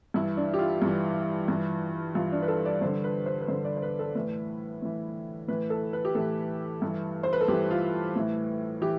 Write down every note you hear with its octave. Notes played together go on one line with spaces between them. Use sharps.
G2 E3 E4
D4
G4
F4
G2 E3
G2 E3
G2 E3 F4
D4
B4
A4
D5
G2 D3 C5
B4
C5
B4
G2 D3 C5
D5
C5
B4
A4
A2 E3 B4
A2 E3
A2 E3 B4
A4
B4
G4
A2 E3 A4
G2 E3
C5
B4
A4
G2 E3 G4
F4
A2 E3
E3 G4